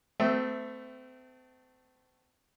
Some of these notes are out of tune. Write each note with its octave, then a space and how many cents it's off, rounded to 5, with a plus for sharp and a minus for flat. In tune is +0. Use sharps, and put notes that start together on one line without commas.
A3 +10 C4 -35 E5 +0